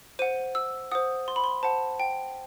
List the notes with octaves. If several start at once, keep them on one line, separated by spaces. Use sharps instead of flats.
C5 F#5 D#7
E6
C5 F#5 D#6
C6
B5
C6
C5 F#5 A5
G5